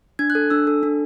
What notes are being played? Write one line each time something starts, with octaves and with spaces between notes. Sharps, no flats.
D4 G#6
F#6
A4
D4 E6
A4
D4